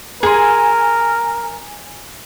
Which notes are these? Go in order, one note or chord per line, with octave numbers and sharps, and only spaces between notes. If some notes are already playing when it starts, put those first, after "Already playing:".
G#4 A#4 G#5 C6